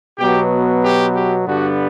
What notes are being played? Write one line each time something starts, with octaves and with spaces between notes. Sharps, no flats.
B2 F#3 B3 G4
G4
G4
G2 D3 G3 B3 F#4